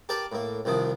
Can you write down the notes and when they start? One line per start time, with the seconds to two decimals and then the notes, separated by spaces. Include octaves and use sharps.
0.09 G4 A#4 D5 A5
0.32 A2 A#3
0.65 C2 C3 D#3 F3